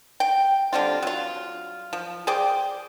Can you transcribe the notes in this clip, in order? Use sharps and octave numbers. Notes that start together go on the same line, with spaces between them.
G5
D3 G3 C4 F4
F#3 F4
F3
G#4 C5 D5 G5